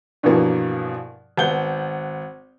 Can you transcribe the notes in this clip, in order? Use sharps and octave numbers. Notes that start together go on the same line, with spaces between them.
G2 B2 E3 F3 A#3 F#4
G#1 B3 F#5 G6 G7